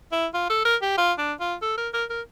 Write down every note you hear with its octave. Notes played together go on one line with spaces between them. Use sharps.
E4
F4
A4
A#4
G4
F4
D4
F4
A4
A#4
A#4
A#4